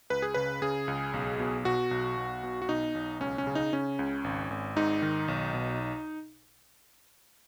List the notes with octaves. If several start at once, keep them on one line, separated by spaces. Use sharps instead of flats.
C#2 B4
G#4
C#3 B4
C#3 G#4
C#2
B1
B2
B2 F#4
B1
B1
B2
F#4
B2 D#4
B1
C#2 C#4
C#4
C#3
D#4
C#3 C#4
C#2
G#1
G#1
G#2 D#4
D#3
B1
B2